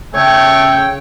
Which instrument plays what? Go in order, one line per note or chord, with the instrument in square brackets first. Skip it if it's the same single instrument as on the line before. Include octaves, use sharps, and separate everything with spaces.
[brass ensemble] C#3 G5 [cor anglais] A3 [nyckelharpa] C#5